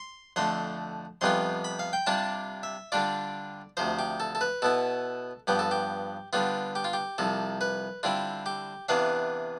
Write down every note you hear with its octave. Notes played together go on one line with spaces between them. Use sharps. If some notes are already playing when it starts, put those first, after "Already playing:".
Already playing: C6
F2 D3 A3 C6
F2 C3 G3 B3 F4 C6
B5
F5
G5
C3 G3 D4 F4 A5
E5
D3 G3 D4 F4 D5
D2 C3 F3 C5
G4
A4
A4
B4
B2 B3 E4 A4
G2 F3 B3 G4
A4
G4
D3 G3 B3 F4
G4
F4
G4
C2 C3 F3 A4
B4
D3 G3 C4 E4 F4
G4
C3 E3 B3 D4 F5